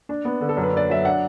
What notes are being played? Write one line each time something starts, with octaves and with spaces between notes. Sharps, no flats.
D4
B3
D3
A4
F#2
B4
D4 D5
F#3 E5
D4 F#5